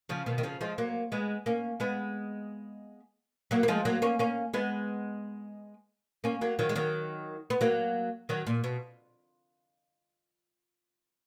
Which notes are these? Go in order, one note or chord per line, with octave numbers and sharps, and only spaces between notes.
C#3 F3
B2 D#3
D#3
C#3 F3
F3 G#3
F#3 A#3
G#3 B3
A#3 C#4
G#3 B3
F#3 A#3
A#3
F3 G#3
F#3 A#3
A#3 C#4
A#3 C#4
G#3 B3
A#3 C#4
F#3 A#3
D#3 F#3
G#3
D#3 F#3
B3
F#3 A#3
D#3 F#3
A#2
B2